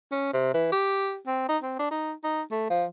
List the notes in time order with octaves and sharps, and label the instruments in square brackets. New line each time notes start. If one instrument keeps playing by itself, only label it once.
[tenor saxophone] C#4
C3
E3
G4
C4
D#4
C4
D4
D#4
D#4
A3
F3